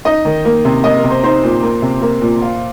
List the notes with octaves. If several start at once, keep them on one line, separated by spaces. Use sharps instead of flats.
D#4 D#5
D#3
A#3
C3
A#3 D#5
A#4
C3
C5
D#4 C5
A#2
A#3
C3
A#3
A#2
F4